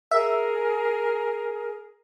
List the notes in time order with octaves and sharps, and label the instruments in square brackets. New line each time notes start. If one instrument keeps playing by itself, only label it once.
[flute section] G#4 A#4 [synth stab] E5